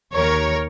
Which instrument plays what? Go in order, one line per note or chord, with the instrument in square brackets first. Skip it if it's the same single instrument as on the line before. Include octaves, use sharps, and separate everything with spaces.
[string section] D#2 D#3 A#4 C#5